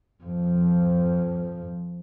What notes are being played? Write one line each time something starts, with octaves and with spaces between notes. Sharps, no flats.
F2 F3